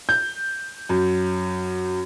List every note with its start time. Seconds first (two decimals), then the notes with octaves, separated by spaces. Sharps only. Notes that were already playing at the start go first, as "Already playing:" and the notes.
0.09 G6
0.89 F#2